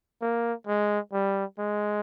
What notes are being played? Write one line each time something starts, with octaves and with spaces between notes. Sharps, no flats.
A#3
G#3
G3
G#3